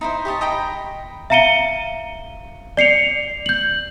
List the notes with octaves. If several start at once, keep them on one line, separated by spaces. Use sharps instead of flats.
D#4 E4 C5
G4 C#5 D#5 A5
D#5 G5 A#5 B5
E5 F5 A#5 C#7 D#7 G7
D5 C7 C#7 F7
G6 F#7